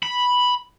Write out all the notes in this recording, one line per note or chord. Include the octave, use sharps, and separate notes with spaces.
B5